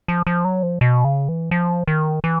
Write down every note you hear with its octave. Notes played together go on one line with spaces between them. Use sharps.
F3
F3
F#3
F3
B2
C#3
E3
F3
D#3
E3